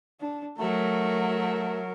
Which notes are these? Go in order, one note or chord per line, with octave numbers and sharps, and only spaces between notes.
D4
F#3 A3 A#4